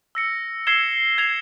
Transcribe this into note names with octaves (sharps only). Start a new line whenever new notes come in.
E6 A#6 C#7
E6 G#6 C7 E7 G7
G#6 C7 F7